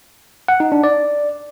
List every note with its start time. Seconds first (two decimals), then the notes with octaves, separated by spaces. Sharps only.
0.48 F#5
0.60 D#4
0.72 D4
0.84 D5